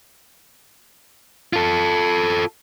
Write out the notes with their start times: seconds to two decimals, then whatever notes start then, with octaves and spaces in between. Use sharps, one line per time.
1.53 F4 A4